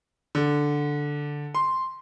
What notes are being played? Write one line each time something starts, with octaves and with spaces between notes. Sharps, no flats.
D3
C6